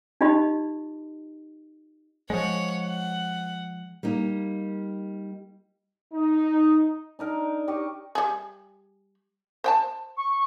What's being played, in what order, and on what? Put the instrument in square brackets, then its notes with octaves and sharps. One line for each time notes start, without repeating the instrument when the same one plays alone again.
[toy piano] D#4 F4 G4 D#5 B5
[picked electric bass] F3 G#3 [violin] C#5 F#5
[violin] F#5
[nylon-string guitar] G3 A#3 D#4
[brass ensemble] D#4
[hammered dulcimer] D4 D#4 A#4
G4 D#5 C#6
[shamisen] G3 G#4
C5 G5 A5
[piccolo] C#6